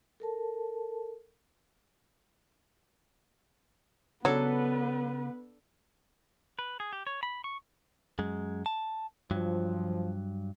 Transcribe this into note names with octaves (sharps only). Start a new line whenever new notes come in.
A4 A#4 A5
C#3 F#3 B3 D4 A4 B4
B4
G#4
G4
C#5
B5
C#6
F#2 G#3
A5
G2 F3 F#3